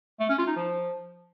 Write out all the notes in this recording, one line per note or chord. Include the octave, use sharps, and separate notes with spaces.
A3
C#4
F4
D#4
F3